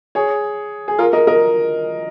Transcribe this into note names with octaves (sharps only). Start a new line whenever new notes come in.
G#4 C#5
G#4
F4 A#4
A#4 D#5
A#4 D#5